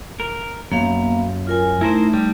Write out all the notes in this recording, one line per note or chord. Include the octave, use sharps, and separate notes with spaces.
A#4
F#2 A#3 B3 F5
F4 A#4 G#5
A3 D#4 E4 A#4 C5
G3